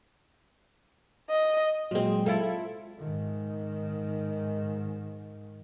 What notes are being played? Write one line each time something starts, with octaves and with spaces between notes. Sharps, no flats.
D#5
A#2 F#3 G#3 C4
E4 F4 A4
G#2 D#3